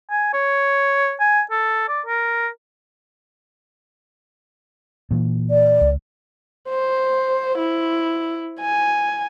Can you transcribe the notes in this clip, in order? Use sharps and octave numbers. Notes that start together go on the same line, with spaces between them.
G#5
C#5
G#5
A4
D5
A#4
A#2 E3
D5
C#2
C5
E4
G#5